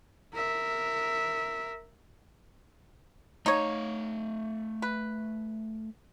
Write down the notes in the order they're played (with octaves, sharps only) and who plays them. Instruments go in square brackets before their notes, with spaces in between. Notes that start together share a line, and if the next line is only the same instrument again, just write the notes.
[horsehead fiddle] A#4 E5
[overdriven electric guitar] A3 F5 [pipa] D#4 C#5
[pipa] B4